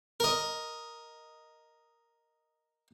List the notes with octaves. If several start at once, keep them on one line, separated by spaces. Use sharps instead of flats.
A#4 D#5